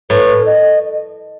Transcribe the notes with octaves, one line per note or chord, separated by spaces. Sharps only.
A2 B4
D#5